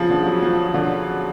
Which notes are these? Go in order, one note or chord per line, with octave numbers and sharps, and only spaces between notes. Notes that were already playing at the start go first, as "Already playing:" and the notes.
Already playing: C#3 F3
D3
F#3
F3
D3